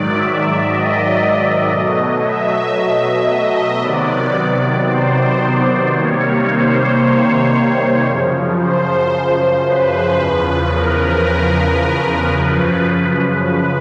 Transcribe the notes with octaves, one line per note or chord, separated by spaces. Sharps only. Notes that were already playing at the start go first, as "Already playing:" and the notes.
Already playing: G#2 D#3 F#3 D5
E5
D#5
B2 F#3 A3
E5
E5
D#5
C3 D#3 F#3 B3 D5
C5
C3 D#3 G3 A#3 C#5
C5
C#5
F#2 C#3 F3
C5
B4
E2 C#3 F3 B4
A#4
A#4
A#4
F#2 C#3 F3 B4
B4